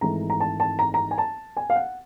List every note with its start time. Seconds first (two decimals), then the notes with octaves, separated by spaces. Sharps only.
0.01 G#1 G#2 E3 A3 A#5
0.30 A#5
0.40 A5
0.60 A5
0.79 A#5
0.94 A#5
1.11 G#5
1.18 A5
1.57 G#5
1.70 F5
1.76 F#5